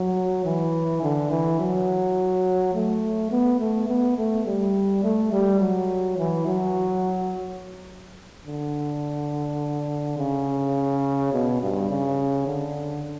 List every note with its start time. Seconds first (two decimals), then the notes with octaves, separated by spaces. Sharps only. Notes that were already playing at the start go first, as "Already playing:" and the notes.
Already playing: F#3
0.45 E3
1.03 D3
1.31 E3
1.60 F#3
2.74 A3
3.31 B3
3.60 A3
3.89 B3
4.17 A3
4.46 G3
5.03 A3
5.32 G3
5.60 F#3
6.18 E3
6.46 F#3
8.47 D3
10.18 C#3
11.33 B2
11.62 G2
11.90 C#3
12.47 D3